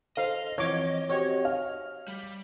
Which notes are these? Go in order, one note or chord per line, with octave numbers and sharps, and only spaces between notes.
A4 C5 D#5 F5
E3 F3 C4 C#5 D6 G#6
C4 F#4 G4 C#5
F5 F6
G3